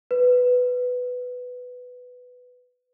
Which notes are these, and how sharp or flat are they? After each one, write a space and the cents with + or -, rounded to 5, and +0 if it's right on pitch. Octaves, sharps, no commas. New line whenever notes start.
B4 +5